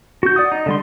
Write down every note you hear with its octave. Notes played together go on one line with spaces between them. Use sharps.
F#4 G6
D5 F#5 D#6
D#4
D3 G3 C6